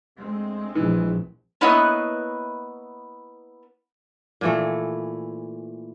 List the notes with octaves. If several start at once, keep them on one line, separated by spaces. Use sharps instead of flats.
D2 G#3 C4
A#1 E3
A#3 B3 E4 B4 C#5 D#5
A#2 E3 A3